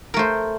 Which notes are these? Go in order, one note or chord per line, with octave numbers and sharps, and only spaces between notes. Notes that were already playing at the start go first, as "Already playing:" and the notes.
A3 A#4 C5